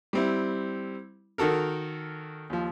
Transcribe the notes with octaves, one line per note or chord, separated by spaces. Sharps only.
G3 C4 E4
D#3 F#4 A4 A#4
D#2 F3